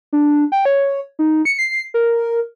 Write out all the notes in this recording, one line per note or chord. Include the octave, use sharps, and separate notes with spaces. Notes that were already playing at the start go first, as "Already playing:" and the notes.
D4
G5
C#5
D#4
C#7
C7
A#4